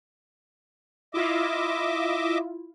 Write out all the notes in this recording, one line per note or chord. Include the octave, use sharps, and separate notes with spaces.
E4 F4 D#5 E5 D6